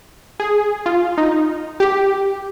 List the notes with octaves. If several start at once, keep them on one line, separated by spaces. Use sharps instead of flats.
G#4
F4
D#4
G4